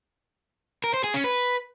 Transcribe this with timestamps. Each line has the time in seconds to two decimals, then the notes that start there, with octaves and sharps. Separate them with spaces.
0.84 A#4
0.94 C5
1.04 G#4
1.14 C#4
1.24 B4